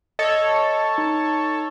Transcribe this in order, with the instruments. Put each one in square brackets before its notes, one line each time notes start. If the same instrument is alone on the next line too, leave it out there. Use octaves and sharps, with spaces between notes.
[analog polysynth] A4 C#5 [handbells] D#5
[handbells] D#4